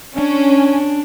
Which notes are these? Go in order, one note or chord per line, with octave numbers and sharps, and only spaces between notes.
C#4 D4